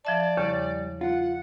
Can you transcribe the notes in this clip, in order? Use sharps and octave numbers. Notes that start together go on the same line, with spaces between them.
F3 D5 E5 A5
E2 C#3 G3 C#5
F4 F#5